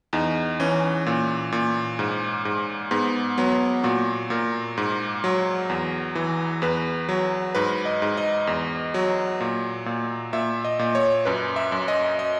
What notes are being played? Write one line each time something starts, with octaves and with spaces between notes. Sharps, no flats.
E2 D#4
E3 C#4
A#2
A#2
G#2
G#2
G#2 B3
F#3 B3
A#2 F#4
A#2 A#4
G#2
F#3
E2
E3
E2 B4
F#3
G#2 B4
D#5
G#2
D#5
E2
F#3
A#2
A#2
A#2 E5
D#5
A#2
C#5
F#2 B4
E5
F#2
D#5
D#5